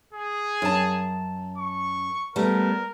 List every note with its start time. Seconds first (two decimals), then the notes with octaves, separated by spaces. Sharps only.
0.13 G#4
0.62 F#2 A5
1.58 C#6
2.36 G3 A3 B3 A#4